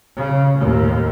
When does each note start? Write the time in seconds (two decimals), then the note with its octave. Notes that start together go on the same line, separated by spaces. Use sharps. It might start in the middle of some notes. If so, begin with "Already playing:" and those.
0.16 C#3
0.58 D#2 A2